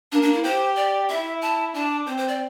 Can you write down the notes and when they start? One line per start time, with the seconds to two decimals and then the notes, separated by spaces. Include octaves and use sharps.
0.11 A#3 D4
0.22 D4
0.33 E4
0.44 G4 C5
0.76 D5
1.09 E4 E5
1.42 A5
1.74 D4 A5
2.07 C4 C5
2.18 C5
2.28 D5